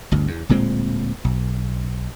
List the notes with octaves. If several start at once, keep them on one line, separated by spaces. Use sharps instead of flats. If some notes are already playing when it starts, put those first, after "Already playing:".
G1 D2
E2
D1 A#2 G#3 C4
B1